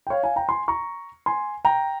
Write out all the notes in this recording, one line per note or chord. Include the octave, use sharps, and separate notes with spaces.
G5
C#5 F5
F5 G#5
G5 A#5
G#5 C6
A#5 C#6
G#5 C6
G5 A#5